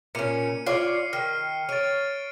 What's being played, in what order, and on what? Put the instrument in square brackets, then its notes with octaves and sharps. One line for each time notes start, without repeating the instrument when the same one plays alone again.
[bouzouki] A#2 C#4 [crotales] C#7 D#7
[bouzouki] F4 C#5 D5 [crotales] C7
[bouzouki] D#3 [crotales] F6
[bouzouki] C#5 [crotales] A6 D7 D#7